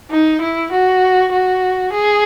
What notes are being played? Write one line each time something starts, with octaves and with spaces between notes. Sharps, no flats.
D#4
E4
F#4
F#4
G#4